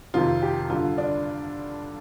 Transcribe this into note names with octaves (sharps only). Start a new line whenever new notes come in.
F2 C3 D#3 F4
G4
G2 D3 F4
D4